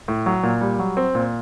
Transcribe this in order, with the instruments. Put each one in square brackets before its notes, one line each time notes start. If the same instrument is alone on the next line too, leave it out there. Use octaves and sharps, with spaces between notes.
[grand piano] A2
F#3
A#2
G3
F#3
C4
A#2